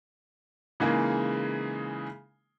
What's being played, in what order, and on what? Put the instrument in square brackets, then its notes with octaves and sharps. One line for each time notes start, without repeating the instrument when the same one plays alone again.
[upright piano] C#3 E3 G#3 A#3 D#4 G#4